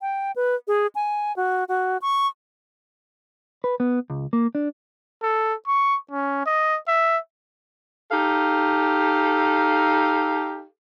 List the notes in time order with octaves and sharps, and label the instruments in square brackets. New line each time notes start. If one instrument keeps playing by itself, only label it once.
[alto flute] G5
B4
G#4
G#5
F#4
F#4
C#6
[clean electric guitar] B4
B3
C#2
A#3
D4
[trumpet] A4
C#6
C#4
D#5
E5
[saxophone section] D#4 G4 A4 F5